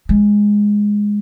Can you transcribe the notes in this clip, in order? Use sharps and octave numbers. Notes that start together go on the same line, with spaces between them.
G#3